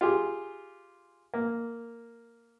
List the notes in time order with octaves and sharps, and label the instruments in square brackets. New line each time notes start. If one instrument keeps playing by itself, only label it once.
[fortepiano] F4 G4 G#4
A#3